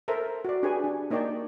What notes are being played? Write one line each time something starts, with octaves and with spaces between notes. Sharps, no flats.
A4 A#4 C5 E5 A5
F#4 D5
D4 G4 G#4 B4 C#5 G#5
D4
A#3 D#4 C#5 D5 G5 A5